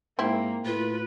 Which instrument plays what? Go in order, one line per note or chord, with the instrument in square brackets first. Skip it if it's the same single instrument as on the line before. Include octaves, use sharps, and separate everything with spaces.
[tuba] G#2 [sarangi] A#3 [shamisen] C4 E4
[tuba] A2 [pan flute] F4 [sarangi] B4